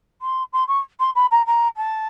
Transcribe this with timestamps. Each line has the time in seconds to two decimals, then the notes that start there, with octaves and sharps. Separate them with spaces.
0.22 C6
0.53 C6
0.68 C#6
1.00 C6
1.15 B5
1.31 A#5
1.47 A#5
1.77 A5